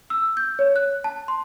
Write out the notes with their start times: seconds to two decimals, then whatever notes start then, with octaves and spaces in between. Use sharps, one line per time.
0.10 E6
0.37 G6
0.59 C#5
0.76 F#6
1.04 A5
1.28 C6